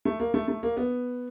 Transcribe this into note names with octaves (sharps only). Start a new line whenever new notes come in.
A3
A#3
A3
A3
A#3
B3